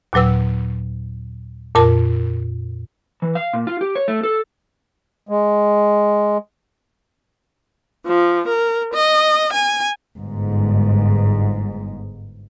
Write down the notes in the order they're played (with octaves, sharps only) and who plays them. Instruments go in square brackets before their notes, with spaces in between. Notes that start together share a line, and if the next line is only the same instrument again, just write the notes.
[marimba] D#2 A#2 F#3 B4 E6
F2 A#2 A#4 A5
[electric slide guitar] E3
F5
A#2
F4
G4
C#5
A3
A4
[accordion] G#3
[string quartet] F3
A#4
D#5
G#5
[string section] G1 G#2